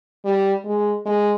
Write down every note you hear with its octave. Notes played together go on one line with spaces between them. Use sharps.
G3
G#3
G#3